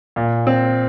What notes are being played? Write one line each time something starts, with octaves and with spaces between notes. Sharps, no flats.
A#2
C4